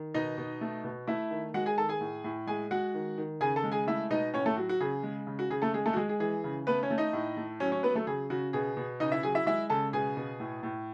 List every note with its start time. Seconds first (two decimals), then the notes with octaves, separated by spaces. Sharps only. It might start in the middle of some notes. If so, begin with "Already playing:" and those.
Already playing: D#3
0.14 B2 D#4 D#5
0.38 B2
0.61 A3
0.84 B2
1.07 A3 E4 E5
1.31 D#3
1.54 G#3 F#4 F#5
1.66 G#4 G#5
1.78 D#3 A4 A5
1.89 G#4 G#5
2.01 A2
2.24 A2
2.47 G#3 G#4 G#5
2.71 G#3 F#4 F#5
2.94 D#3
3.18 D#3
3.41 C#3 G#4 G#5
3.56 A4 A5
3.64 G#3
3.72 G#4 G#5
3.87 A3 E4 E5
4.10 B2 D#4 D#5
4.34 A2 C#4 C#5
4.46 A3 A4
4.57 F#3 F#4
4.69 F#4
4.80 C#3 G#4
5.03 G#3
5.27 C#3
5.39 F#4
5.50 C#3 G#4
5.62 A3 A4
5.74 G#3 G#4
5.86 A3 A4
5.93 F#4
5.97 G#3 G#4
6.09 G#4
6.20 E3 G#4
6.44 C#3
6.67 A3 B3 B4
6.83 C#4 C#5
6.91 A3
6.98 D#4 D#5
7.13 A2
7.37 A3
7.60 F#3 C#4 C#5
7.72 C#4 C#5
7.83 F#3 B3 B4
7.95 A3 A4
8.07 C#3 G#4
8.30 C#3 F#4
8.53 B2 G#4
8.77 B2
9.00 C#3 D#4 D#5
9.12 E4 E5
9.23 F#3 G#4 G#5
9.35 E4 E5
9.47 G#3 E4 E5
9.70 C#3 A4 A5
9.93 B2 G#4 G#5
10.17 B2
10.40 A2
10.63 A2